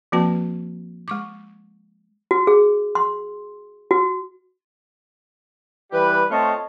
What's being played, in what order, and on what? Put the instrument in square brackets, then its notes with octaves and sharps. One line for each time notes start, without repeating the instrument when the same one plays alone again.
[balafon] F3 A#3 C4 F#4 B4 A5
G#3 C#6 D6
[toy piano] F#4
G#4
C6
F#4
[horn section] E3 G3 G4 B4
A3 C4 F4 C#5 D#5 A5